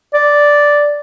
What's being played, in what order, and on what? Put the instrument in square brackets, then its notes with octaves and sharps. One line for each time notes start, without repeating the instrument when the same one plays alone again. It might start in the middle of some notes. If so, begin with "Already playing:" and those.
[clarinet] D5